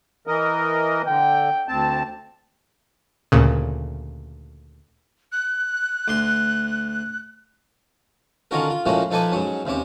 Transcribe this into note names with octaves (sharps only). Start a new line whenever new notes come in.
E3 A#4 D#5
D3 G5
D2 C4 A5
D2 A#2 C#3
F#6
D2 C6
D3 D#3 C#4 F4 F#4 A#4
F4
A2 F3 G#3 A#3 C#4 F#4
F3 D#4 A4 B4 G#5 D6
G#2 F#3 C#4
D#2 C3 C#4 D6